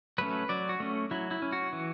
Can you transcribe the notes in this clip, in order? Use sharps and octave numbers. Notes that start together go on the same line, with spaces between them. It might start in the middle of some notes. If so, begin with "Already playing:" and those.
F#3 A3 C#4 B4
F#3 D5
F#4
A3 C#4
F#3 E4
E4
C#4
F#4
E3